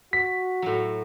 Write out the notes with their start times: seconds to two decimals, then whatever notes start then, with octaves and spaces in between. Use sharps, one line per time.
0.13 F#4 B6
0.62 A2 F#3